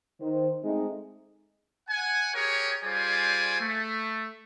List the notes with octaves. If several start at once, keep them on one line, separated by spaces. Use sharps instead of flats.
D#3 C5
G#3 A3 C4 D#4
F#5 G#5
G4 G#4 A#4 C#5
G3 F4 G#4 C5 D5 G#5
A3